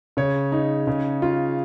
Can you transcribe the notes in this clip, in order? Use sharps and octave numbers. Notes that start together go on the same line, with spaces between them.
C#3 C#5
D#4
C#3
F4